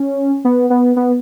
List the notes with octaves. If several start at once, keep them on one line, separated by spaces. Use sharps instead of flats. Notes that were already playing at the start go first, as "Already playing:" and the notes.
Already playing: C#4
B3
B3
B3